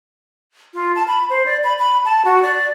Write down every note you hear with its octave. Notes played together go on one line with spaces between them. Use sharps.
F4
A5
B5
C5
D5
B5
B5
A5
F#4
D5